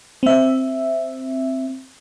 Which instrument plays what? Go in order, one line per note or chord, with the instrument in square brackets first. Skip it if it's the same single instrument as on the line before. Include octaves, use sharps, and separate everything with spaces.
[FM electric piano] C4 E5